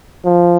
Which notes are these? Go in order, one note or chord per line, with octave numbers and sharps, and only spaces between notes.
F3